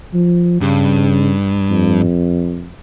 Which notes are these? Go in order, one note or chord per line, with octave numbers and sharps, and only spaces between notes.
F3
G2 C#3
F2